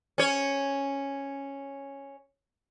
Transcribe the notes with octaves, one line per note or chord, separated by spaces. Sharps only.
C#4 C#5